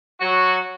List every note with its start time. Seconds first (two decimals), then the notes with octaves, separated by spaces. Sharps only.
0.21 F#3 F#4